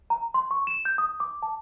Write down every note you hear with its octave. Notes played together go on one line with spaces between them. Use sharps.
A#5
C6
C#6
E7
G6
D#6
D6
A5